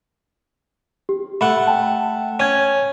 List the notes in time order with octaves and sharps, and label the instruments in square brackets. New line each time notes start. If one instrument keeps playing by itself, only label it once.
[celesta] G4
[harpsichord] A3 F#5 [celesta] B5
[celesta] G5 A5
[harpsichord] C#4 [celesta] G#6 D#7